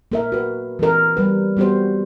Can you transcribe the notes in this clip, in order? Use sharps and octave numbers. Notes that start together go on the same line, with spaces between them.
A#3 A#4 E5
F#4 B4
E3 G#3 C4 A#4
G3 B4
G3 B3 F#4 G4 C5